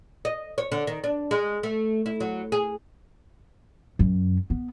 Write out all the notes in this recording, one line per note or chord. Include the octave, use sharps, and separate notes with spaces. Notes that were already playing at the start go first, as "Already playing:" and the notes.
D#5
C#5
D3
D#3
D4
G#3
A3
E4
F#3
G#4
F#2
B3